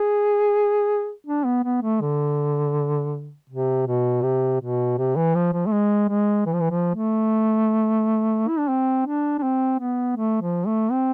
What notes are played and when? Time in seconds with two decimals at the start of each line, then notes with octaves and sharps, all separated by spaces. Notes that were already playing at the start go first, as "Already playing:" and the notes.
Already playing: G#4
1.27 D4
1.45 B3
1.64 B3
1.82 A3
2.01 D3
3.50 C3
3.87 B2
4.23 C3
4.61 B2
4.98 C3
5.16 E3
5.35 F3
5.53 F3
5.66 A3
5.72 G#3
6.09 G#3
6.46 E3
6.53 F3
6.60 E3
6.71 F3
6.95 A3
8.48 E4
8.59 D4
8.69 C4
9.06 D4
9.39 D4
9.43 C4
9.80 B3
10.17 A3
10.42 F3
10.67 A3
10.91 C4